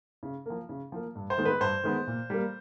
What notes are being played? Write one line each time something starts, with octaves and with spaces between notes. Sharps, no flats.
C#3
F3 A#3
C#3
F3 A#3
G2
C5
D#3 G#3 B3
B4
G2 C5
D#3 G#3 B3
A#2
G3 A#3